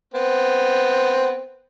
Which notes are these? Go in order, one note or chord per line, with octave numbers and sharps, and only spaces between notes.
B3 C4